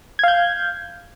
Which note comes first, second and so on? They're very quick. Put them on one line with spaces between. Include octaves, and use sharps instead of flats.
G#6 F5 G6